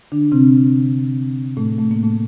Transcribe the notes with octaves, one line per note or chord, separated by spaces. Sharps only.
D3 D4
C3 C4
A2 A3
A3
A#3
A2 A3